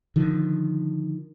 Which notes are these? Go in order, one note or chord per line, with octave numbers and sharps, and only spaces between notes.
D3 D#3 F3